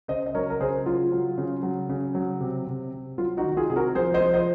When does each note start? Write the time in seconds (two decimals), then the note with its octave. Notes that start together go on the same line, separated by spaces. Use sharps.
0.08 C#3 C5 D#5
0.26 D#5
0.34 F#3 A#4 C#5
0.50 A#4
0.61 C#3 G#4 C5
0.86 F#3 F4
1.12 F#3
1.38 C#3
1.63 F#3
1.89 C#3
2.15 F#3
2.40 C3
2.67 C3
2.92 C3
3.18 F#3 F4
3.37 D#4 F#4
3.43 D#3
3.52 F#4
3.57 F4 G#4
3.70 C3 G#4
3.76 F#4 A#4
3.95 F3 G#4 C5
4.14 C5 D#5
4.21 F3
4.34 C5 D#5